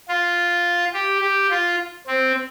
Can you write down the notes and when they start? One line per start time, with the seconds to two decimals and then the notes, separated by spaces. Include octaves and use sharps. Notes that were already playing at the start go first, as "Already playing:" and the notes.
0.09 F4
0.94 G4
1.22 G4
1.51 F4
2.07 C4